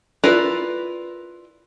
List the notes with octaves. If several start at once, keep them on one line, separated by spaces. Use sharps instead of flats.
E4 F4 A#4 B4 D5